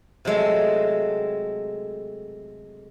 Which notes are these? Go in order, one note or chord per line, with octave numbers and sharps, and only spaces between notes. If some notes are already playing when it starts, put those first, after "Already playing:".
C3 F#3 G#3 A3